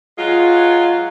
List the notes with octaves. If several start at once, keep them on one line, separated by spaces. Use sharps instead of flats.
F#3 G#3 F4